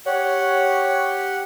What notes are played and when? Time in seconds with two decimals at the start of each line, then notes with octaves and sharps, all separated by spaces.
0.06 G4 C#5 F#5